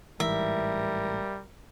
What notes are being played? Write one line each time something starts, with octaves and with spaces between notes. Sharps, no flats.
A1 G#2 E3 G3 A#4 E5